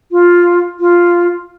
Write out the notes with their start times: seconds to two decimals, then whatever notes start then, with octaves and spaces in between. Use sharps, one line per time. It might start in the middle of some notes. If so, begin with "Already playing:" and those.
0.12 F4
0.80 F4